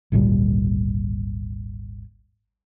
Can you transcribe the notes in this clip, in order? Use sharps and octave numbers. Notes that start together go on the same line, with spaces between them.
G#1 D2 A#2 G3